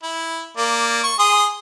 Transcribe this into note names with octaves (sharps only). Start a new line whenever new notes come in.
E4
A#3 D5
C#6
G#4 C6 D#6